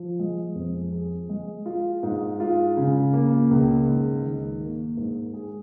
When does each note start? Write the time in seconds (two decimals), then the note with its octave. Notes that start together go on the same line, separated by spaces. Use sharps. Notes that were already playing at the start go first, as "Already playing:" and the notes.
Already playing: F3
0.19 G#3
0.55 F2
0.92 G#4
1.29 G#3
1.66 F4
2.03 G#2
2.40 F4
2.77 C#3
3.13 A#3
3.51 C#2
3.87 G#2
4.23 D#3
4.60 A#3
4.97 G#2
5.34 G#4